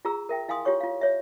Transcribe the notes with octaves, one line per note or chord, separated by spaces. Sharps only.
F4 G#4 A#5 E6
A#4 E5 G5
E4 F5 G#5 C6 D#6
F4 G4 C#5 C#6
F4 F5
C#5 E5